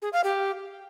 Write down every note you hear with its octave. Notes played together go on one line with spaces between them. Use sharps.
G#4
F5
G4